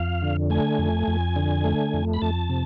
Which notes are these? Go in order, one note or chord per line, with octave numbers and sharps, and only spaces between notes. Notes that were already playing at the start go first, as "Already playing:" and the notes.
Already playing: F2 F5
D3
A3 G#5
F2
F2
D3
A3
F2
B5
F2 A5
C3